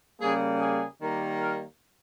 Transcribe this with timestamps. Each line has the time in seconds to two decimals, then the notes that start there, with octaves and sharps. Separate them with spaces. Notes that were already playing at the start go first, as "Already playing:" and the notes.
0.20 C#3 G3 A#3 G#4
0.60 G#4
1.00 D#3 G3 A#3
1.40 A#4